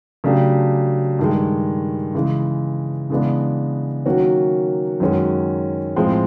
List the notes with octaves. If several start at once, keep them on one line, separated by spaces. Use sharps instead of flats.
C#3 F#3 A3 D4 G4
G2 D#3 G#3
C#3 E3 G#3
C#3 E3 G#3 B3 D4
D#3 F#3 A#3 C#4 F#4
F#2 D#3 G#3 C#4 F#4
A2 F3 G#3 C4